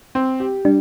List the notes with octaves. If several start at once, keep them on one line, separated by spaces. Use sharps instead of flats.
C4
G4
G3 D4